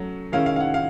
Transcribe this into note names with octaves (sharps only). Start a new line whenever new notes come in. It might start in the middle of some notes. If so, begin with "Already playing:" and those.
Already playing: F#3 A3 C#4
D#3 G#3 C#4 E4 F5
F5
F5
F#5
F5